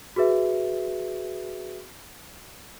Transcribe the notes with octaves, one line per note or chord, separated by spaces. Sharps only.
F#4 G#4 B4 E5